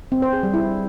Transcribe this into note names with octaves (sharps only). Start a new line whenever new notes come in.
C4
C5
G#4
G3
E4